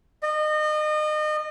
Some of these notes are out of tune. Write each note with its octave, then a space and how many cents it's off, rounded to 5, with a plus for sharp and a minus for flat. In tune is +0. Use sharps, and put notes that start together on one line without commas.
D#5 -30